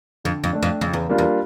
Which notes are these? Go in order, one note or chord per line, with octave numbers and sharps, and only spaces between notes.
F2 D3
F2
A3 D4
F2
F2 C#3
E2
G3 A#3 D4 F4
E2